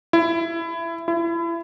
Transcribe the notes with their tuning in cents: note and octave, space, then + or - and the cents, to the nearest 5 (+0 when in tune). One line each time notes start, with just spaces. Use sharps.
E4 +20
E4 +30